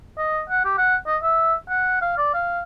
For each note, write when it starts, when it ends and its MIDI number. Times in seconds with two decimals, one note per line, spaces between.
0.18 0.40 75
0.50 0.63 78
0.65 0.76 67
0.78 0.96 78
1.07 1.17 75
1.22 1.54 76
1.69 2.00 78
2.01 2.14 77
2.18 2.33 74
2.34 2.61 77